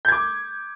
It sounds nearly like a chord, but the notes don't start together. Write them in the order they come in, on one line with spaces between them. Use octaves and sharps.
G6 G#6 D6